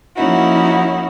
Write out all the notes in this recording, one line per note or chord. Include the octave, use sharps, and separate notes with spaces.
F3 A#3 C#4 D#4 E4 F#4